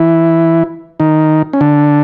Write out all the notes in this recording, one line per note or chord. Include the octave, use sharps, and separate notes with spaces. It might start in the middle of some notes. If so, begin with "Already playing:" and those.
Already playing: E3 E4
D#3 D#4
C#4
D3 D4